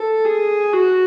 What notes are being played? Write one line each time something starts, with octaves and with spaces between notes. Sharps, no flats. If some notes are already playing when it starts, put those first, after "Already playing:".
Already playing: A4
G#4
F#4